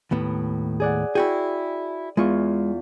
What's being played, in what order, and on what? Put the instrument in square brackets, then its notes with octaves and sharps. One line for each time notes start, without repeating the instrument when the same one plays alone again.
[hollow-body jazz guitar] D#2 A2 B3
[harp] G#4 D5 F#5
[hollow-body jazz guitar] E4 F#4 G#4 [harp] G5
[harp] E2 F4 C#6 [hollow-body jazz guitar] G#3